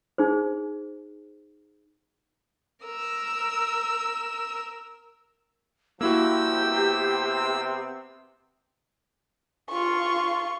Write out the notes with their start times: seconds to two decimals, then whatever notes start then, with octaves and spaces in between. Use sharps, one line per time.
0.18 D#4 G#4 C5
2.84 A#4 E6
6.01 C2 F3 A#3 E4 F#4 G4 E6
6.65 C3 B3 C4
9.70 F4 C#6